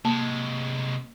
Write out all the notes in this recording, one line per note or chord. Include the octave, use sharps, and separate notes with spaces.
C3 G#3 A#3 A5